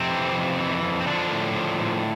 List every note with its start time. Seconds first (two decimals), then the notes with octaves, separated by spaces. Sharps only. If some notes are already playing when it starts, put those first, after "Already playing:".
Already playing: F2 C3 C4
0.09 E3
0.34 F2
0.58 E3
0.83 F2
1.01 C4
1.07 D3 F3 D4
1.32 A2
1.56 F3
1.80 A2